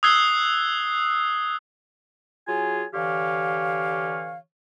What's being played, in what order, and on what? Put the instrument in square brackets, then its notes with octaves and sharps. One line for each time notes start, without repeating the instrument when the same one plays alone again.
[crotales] D#6 E6 F#6 G#6 C7 G7
[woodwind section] F#3 F4 G#4 G#5
D3 E3 G4 C#5 F5